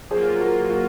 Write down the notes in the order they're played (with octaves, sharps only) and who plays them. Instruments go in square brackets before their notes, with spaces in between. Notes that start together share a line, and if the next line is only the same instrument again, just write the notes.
[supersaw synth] F#3 A#3 F4 [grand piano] G#4 C5
[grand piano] F#4 A#4
F#4 A#4